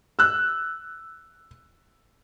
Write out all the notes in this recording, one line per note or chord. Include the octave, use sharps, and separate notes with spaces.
E6 F#6